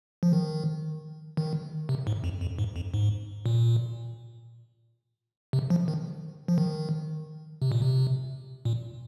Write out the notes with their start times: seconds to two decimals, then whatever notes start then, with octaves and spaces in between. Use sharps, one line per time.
0.23 F3
0.33 D#3
1.37 D#3
1.89 C3
2.07 G#2
2.24 F2
2.41 F2
2.59 G#2
2.76 F2
2.94 G#2
3.46 A#2
5.53 C3
5.70 F3
5.88 D#3
6.48 F3
6.58 D#3
7.62 C3
7.72 A#2
7.82 C3
8.65 A#2